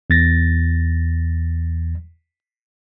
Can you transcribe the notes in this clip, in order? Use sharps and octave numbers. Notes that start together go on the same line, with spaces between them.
E2 A6 A#6